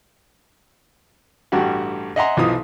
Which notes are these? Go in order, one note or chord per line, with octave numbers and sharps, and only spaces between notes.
A1 G2 F#4 G4 F#5
D#5 E5 F#5 G#5 A#5 C6
B1 E3 F3 F5 D#6